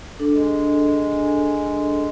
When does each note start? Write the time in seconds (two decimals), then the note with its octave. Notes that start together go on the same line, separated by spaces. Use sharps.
0.19 D4 A4
0.33 G#3